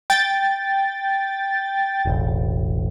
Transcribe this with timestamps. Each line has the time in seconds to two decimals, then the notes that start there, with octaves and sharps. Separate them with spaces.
0.10 G5 A6
2.05 E1 A1